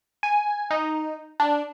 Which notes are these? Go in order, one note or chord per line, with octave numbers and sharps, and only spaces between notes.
G#5
D#4
D4